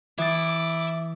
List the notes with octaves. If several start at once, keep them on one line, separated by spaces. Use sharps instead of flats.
E3 E4 E5 D6 D#6 A6